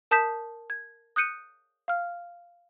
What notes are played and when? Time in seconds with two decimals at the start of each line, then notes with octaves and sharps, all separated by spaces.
0.11 A#4 A5 D#6 G6 B6 E7
0.70 G#6
1.16 D#6 F#6 G6 C#7 D#7
1.88 F5 F6